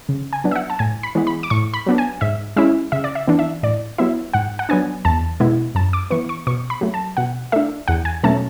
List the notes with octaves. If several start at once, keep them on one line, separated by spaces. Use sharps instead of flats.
C#3
G#5
F#3 B3 D4
E5
F#5
A5
A2 G#5
B5
E3 G#3 B3
B5
D6
A2 C#6
B5
F#3 B3 D4
G#5
G#2 E5
G#3 C#4 E4 E5
C#3 E5
D5
E5
E3 B3 D4
E5
A2 D5
F#3 B3 E4 E5
G#2 F#5
F#5
F#3 B3 D4 G#5
E2 A5
B2 G#3 B3 E4
F#2 A5
D6
E3 B3 C#6
C#6
B2 C#6
B5
F#3 A3
A5
B2 F#5
A3 D4 E5
E2 F#5
G#5
B2 F#3 A3 C#4 A5